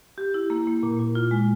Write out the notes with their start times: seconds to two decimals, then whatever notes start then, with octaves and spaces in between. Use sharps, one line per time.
0.18 G4
0.34 E4
0.50 A#3
0.67 A#3
0.83 A#2
0.99 A#2
1.15 F4
1.31 G#3